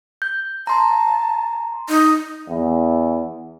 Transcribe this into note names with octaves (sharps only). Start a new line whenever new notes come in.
G6
A5 A#5 C6
D#4
E2